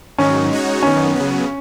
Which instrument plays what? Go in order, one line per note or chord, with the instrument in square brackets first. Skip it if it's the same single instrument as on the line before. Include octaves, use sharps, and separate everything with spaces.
[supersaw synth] G#2 D#3 F#3 D#4 [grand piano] C#4
[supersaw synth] G#3 D#4 F#4 C#5
[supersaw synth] F#2 D#3 B3 D#4 [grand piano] C#4
[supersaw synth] C#3 F#3 B3